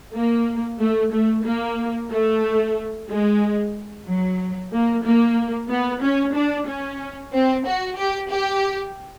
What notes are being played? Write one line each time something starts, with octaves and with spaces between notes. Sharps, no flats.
A#3
A3
A3
A#3
A3
G#3
F#3
A#3
A#3
B3
C#4
D4
C#4
C4
F#4
G4
G4